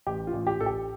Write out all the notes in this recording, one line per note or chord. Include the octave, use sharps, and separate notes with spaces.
A1 G4
F4
A1
G4
A1 A4
G4